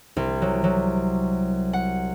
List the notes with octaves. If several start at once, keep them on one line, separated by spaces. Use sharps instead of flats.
C2
F#3
F#3
F#5